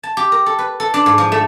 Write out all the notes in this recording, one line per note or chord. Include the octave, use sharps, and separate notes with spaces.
A5
G4
A#4
A4
B4
A4
D4
G#2
F3
A3